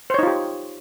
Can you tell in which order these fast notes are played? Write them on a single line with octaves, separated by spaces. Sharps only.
C5 C#5 D#4 F4 G4